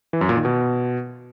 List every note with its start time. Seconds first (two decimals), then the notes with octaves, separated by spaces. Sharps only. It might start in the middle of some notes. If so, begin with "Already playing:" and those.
0.13 E3
0.21 F#2
0.29 A#2
0.37 D#3
0.45 B2